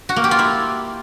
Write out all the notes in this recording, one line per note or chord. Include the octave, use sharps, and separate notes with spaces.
F#4
A#3
G4
F4
E4